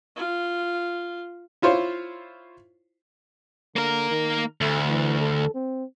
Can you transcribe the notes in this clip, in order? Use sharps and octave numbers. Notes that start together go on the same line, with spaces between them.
F4
E4 F4 C5 C#5
D3 A#3 A#4
D#3
D2 A3
E3
A4
C4